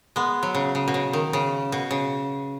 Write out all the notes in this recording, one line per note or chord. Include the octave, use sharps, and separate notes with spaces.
G#3 B3
F#3
C#3
C#3
B2
C#3
D#3
C#3
B2
C#3